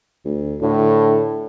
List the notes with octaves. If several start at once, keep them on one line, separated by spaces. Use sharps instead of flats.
D2
A2 D3